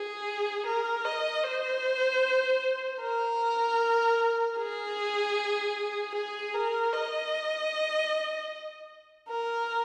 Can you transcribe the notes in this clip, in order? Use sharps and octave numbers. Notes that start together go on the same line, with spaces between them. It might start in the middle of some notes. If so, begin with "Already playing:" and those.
Already playing: G#4
A#4
D#5
C5
A#4
G#4
G#4
A#4
D#5
A#4